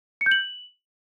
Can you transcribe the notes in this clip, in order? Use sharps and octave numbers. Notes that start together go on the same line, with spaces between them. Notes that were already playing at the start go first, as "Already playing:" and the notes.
C#7
G6
F#7